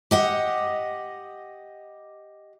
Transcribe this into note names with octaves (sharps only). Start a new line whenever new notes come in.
G4 D#5 F#5